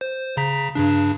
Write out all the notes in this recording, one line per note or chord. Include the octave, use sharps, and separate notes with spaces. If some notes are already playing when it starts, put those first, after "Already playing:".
C5
C#3 A#5 B6
G2 C#3 D4